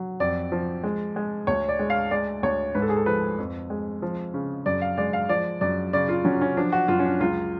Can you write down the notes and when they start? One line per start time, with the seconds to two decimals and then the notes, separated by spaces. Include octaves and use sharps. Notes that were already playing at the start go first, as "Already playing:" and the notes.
Already playing: F#3
0.20 F2 D5
0.52 F3
0.84 G#3
1.16 G#3
1.47 D2 C#5
1.69 D5
1.79 G#3
1.90 F5
2.11 G#3 D5
2.43 D2 C#5
2.75 G#2 B4
2.82 A4
2.89 G#4
2.96 A4
3.06 F3 B4
3.39 F2
3.70 G#3
4.02 F3
4.34 C#3
4.66 F#2 D5
4.82 F5
4.98 G#3 D5
5.13 F5
5.29 F3 D5
5.61 F#2 D5
5.93 C#3 D5
6.09 F4
6.25 F#3 C#4
6.41 C#4
6.57 F3 D4
6.72 F#4
6.88 F#2 F4
6.99 C#4
7.05 D4
7.20 C#2 F4